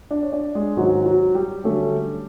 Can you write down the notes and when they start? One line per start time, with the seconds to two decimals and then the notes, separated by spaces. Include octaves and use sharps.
0.11 D4 D5
0.23 C#5
0.32 D4 D5
0.55 G#3 G#4
0.77 G#2 D#3 F#3 G#3 C#4 F#4
1.06 F#3 F#4
1.35 G3 G4
1.64 D3 F#3 A3 C#4